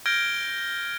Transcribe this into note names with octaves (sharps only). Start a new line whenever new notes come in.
F6 G6 G#6 A#6 D7 G7